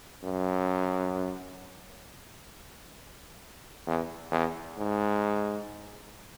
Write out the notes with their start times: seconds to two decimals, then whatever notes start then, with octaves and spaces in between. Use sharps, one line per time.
0.24 F#2
3.87 E2
4.31 E2
4.78 G#2